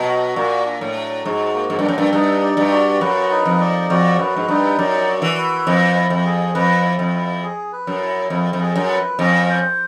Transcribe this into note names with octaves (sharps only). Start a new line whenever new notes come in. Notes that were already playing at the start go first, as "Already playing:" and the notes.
Already playing: B2 F#3
F#4
A#2 A#3
D4
A2
F#3
G#2 F#4
A#3
G#2
G2
F#2 D4
G2
G2 D#4
D5
G2
F#4
F#2 B4
D#4
F2
D5
F2 F#4
F#2 B4
G#2
G2 D#4
F#2 D5
F#4
E3
B4
F2 E4
E4
F2
G#4
F2 B4
E4
F2
E4
G#4
B4
F#2
E4
F2 E4
F2
G#4
F#2
B4
F2 C#4
C5